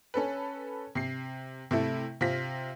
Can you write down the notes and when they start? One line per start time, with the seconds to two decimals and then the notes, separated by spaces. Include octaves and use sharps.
0.14 C#4 A4 B4
0.95 C3 C7
1.71 C3 A3 E4
2.21 C3 C4 F4 A#6 B6